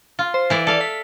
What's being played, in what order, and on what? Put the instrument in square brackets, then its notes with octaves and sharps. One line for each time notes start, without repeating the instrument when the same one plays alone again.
[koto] F4
[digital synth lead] C5
[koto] E3 E4 D5
[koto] A4 F5 [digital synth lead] D5
[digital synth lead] B6